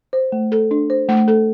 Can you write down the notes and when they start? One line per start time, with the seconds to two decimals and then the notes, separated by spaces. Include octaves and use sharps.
0.13 C5
0.32 A3
0.52 A4
0.71 D4
0.90 C5
1.09 A3
1.28 A4